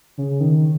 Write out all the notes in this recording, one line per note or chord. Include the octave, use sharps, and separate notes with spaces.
C#3
D#3